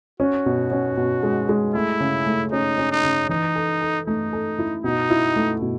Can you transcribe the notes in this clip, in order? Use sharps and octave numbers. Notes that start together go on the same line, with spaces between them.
C#4 F#4
B2
C#4
B2
G#3
G#3
A3 E4
C#3
A3
C#4 D#4
C#4
D#4
C#3
E3 D#4
A4
A4
A3 D#4
A4
E4
B2 D#4
E4
A3
B2